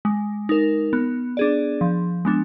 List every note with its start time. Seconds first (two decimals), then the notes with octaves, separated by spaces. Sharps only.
0.05 G#3
0.49 D#4 A#4
0.93 B3
1.37 D4 G#4 D5
1.81 F3
2.25 G#3 B3 D4